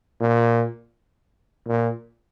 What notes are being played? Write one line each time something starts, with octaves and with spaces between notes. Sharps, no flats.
A#2
A#2